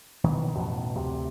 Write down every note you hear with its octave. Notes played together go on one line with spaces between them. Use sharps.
F2 B2 D#3 E3
A1 F2 B2
D2 C3